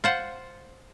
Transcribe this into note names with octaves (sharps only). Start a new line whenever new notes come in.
F4 C5 F#5